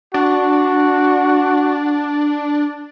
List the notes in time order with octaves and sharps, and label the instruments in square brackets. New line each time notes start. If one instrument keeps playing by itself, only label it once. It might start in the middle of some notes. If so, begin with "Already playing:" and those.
[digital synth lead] D4 [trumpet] F#4